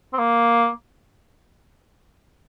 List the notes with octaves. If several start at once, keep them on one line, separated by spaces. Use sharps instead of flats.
C4
A#3